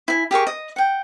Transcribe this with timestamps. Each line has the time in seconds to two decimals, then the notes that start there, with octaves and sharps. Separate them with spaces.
0.08 E4 G#5
0.31 G4 G#4 A#4 C#6
0.47 D#5
0.76 F#5 G5